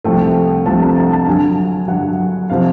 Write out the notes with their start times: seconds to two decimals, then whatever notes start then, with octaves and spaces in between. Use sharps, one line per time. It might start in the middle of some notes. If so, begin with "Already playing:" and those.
0.04 C2 C3 F3 A3 G5
0.66 C2 C3 F3 A3 A5
0.82 A#5
0.96 A5
1.12 A5
1.27 G2 D3 F#3 G#5
1.88 G2 D3 F#3 F#5
2.50 C3 F3 F5